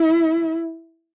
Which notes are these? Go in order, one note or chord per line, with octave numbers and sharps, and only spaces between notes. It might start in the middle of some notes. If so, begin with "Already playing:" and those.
Already playing: E4